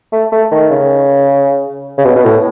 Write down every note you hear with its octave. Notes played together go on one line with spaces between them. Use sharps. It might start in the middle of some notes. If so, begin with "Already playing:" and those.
A3
A3
D#3
C#3
C#3
B2
B2
A2